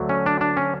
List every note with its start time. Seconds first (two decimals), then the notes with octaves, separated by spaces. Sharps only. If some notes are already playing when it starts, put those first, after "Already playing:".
Already playing: D2 D3 F#3 A3
0.09 C#4
0.26 D4
0.41 D4
0.57 C#4